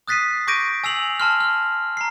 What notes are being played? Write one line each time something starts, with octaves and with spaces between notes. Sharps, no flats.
D#6 F#6 A6 B6 C7 D#7
C#6 D6 G6 A#6 D7 D#7
G#5 E6 C7 F7 F#7
A5 C6 F6
F6
A#5 C7